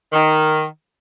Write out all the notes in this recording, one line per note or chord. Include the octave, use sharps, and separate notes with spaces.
D#3